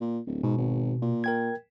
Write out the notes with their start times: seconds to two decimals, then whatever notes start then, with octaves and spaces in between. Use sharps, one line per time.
0.01 A#2
0.27 D1
0.43 G#2 B2
0.58 G#1
1.02 A#2
1.24 A#4 G5 G#6